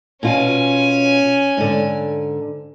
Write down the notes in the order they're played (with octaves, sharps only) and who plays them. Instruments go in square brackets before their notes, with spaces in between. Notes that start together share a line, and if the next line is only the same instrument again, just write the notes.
[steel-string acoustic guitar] B2 F4 [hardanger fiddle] C#4 G#5
[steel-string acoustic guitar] G#2 D3